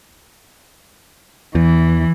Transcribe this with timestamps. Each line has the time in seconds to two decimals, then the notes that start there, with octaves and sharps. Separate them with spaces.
1.55 E2 E3